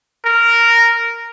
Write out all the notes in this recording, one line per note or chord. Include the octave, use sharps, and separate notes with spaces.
A#4